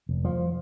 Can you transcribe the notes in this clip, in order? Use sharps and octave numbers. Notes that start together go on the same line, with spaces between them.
F1
F3